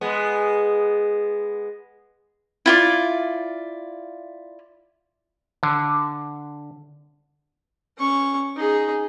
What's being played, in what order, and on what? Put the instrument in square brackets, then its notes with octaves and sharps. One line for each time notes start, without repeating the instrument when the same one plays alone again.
[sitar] G#3 B3
[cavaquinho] E4 F4 D5
[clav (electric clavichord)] D3
[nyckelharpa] C#4 C#6
D#4 G#4